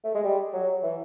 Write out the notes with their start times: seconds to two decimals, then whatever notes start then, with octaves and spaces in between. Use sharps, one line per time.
0.04 A3
0.15 G#3
0.24 G3
0.53 F#3
0.83 E3